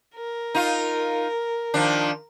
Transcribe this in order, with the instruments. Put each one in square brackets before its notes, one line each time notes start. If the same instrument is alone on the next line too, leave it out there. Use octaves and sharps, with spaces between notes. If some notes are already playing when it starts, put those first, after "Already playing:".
[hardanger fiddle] A#4
[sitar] D#4 F4
D#3 F3 D4